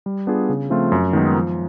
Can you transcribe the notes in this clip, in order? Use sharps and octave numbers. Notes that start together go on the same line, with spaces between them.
G3
B3 D4 F4 G#4
C#3
F3 A3 C4 F4
F#2
D#3 G#3 B3 D#4
F3